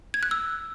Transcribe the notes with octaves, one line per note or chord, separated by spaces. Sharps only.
G#6
F#6
E6